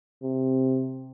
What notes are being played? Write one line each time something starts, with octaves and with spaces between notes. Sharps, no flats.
C3